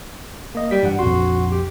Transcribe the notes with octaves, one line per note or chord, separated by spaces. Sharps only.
A#3 D#5
G3 B6
G2 E3 F#5
A#1 F2 F#4 C6
G4